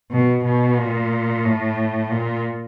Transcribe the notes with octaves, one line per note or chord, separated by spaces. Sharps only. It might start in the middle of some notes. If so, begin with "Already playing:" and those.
B2
B2
A#2
A2
A#2